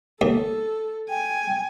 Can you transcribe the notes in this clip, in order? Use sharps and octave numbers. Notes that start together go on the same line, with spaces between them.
D#2 A4
G5 G#5